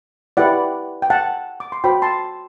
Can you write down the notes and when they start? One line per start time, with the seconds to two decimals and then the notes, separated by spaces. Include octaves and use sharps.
0.37 E4 G4 B4 D5 F#5
1.02 G5
1.10 F#5 A5
1.60 D6
1.72 C6
1.84 F#4 C5 G5 B5
2.02 A5 C6